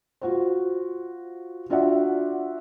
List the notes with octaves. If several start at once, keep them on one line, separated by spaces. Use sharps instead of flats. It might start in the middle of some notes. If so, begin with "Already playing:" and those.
F4 F#4 C5
D4 F4 F#4 D5 E5 F#5